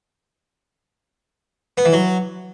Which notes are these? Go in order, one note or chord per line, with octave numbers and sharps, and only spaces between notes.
B3
E3
F#3